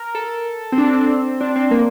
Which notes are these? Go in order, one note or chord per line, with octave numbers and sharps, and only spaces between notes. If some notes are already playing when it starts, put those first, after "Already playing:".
Already playing: A#4
A4
C4
D4
C4
D4
C4
A#3